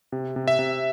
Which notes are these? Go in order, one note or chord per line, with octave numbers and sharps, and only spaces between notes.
C3
C3
E5
C3